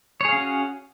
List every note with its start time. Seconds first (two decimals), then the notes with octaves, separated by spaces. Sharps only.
0.21 C#5
0.25 G#4
0.29 F5
0.33 C#4
0.37 F#4